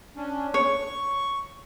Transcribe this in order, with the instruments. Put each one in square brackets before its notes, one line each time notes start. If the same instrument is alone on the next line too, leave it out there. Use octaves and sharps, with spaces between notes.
[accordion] C#4 D4
[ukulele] C#5 [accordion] C#6